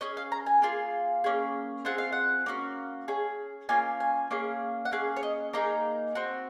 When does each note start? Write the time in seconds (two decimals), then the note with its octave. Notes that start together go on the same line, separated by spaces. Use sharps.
0.01 C#4 G#4 D#5
0.17 F5
0.32 A#5
0.46 G#5
0.62 A#3 F4 G#4
1.24 A#3 C#4 G#4
1.85 C4 F4 G#4 F#5
1.98 F5
2.12 F#5
2.46 A#3 C#4 F#4
3.08 C#4 G#4
3.69 A#3 C#4 F4 G#5
4.00 G#5
4.31 A#3 C#4 G#4
4.85 F#5
4.91 A#3 C#4 G#4 F5
5.16 C#5
5.23 D#5
5.53 A#3 D#4 G#4 A#5
6.15 C4 F#4